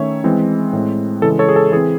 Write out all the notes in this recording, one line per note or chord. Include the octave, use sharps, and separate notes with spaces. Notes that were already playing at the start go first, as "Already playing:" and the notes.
Already playing: D#3 A3 C#4 C#5 E5
E3 G#3 C4
A2 G#3 C4
C#3 E3 G#3 A4
A4 C#5
G#4
A4
E3 C4 G#4